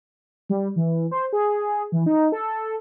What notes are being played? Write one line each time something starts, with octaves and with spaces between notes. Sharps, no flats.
G3
E3
C5
G#4
E3
D#4
A4